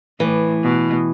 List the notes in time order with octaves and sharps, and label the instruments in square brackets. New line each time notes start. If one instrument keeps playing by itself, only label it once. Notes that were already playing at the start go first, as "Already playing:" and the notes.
[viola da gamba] A2 [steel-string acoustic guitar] E3
[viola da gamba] B2